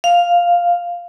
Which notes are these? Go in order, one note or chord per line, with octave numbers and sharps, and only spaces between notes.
F5